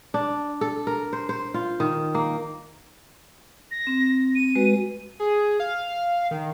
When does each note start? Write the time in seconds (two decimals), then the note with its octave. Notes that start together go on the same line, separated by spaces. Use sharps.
0.14 D4
0.61 A4
0.87 A#4
1.13 C5
1.29 C5
1.54 F4
1.80 D#3
2.15 A#3
3.71 A#6
3.87 C4
4.35 D#7
4.55 G#3 F#4 B4
5.20 G#4
5.60 F5
6.31 D#3